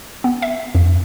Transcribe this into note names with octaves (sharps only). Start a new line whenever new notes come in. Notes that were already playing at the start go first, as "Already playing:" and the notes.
B3
E5
F2